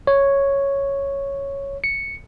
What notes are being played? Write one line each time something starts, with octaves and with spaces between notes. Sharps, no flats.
C#5
C#7